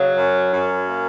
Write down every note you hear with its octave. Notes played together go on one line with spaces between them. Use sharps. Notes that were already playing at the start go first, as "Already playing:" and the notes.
Already playing: C#3 F#3
F#2
F#2
A#3